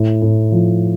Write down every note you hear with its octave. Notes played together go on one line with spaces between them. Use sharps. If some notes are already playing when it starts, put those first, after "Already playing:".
Already playing: A2
A2
F3